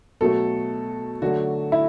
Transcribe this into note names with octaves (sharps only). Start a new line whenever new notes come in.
B2 F#3 A3 A4
D3 F#3 A3 F#4
E4